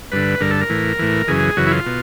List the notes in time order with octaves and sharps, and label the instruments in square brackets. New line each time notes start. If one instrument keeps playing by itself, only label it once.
[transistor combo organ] G2 D3 B4
G2 D3 A#4
A4
A#4
A2 E3
A2 E3
F#2 C#3 E3 G#4
F#2 C#3 E3 F#4
E4
F4
B2